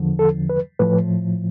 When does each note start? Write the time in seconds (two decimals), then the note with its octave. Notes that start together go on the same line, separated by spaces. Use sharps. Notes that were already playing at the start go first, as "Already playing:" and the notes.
Already playing: E2 D3 F3
0.19 A4
0.49 B4
0.79 A2 F3 B4